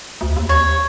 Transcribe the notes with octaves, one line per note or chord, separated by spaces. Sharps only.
D2
D#2
C#5